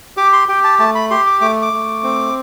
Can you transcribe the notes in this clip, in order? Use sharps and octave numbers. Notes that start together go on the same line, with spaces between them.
G4 D6
C6
G4 G5
A5
A3 A5
B5
G4 C6
D6
A3 D6
D6
A3
C4